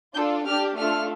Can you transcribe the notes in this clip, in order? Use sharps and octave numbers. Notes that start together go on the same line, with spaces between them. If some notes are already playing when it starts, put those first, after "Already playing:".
D4 F4 A4 G6
D4 G4 F6
A3 D4 F4 A4 F6